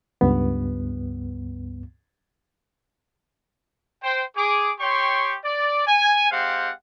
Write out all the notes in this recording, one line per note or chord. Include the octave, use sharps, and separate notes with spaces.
C#2 G2 B3
C5 G5
G#4 D6
G4 C#5 G5 C6 C#6
D5
G#5
G#3 C4 G4 C5 F5 F#5